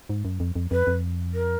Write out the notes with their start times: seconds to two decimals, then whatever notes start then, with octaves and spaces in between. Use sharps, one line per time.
0.10 G#2
0.25 F#2
0.40 F2
0.56 F2
0.71 F2 B4
0.87 F2
1.34 A#4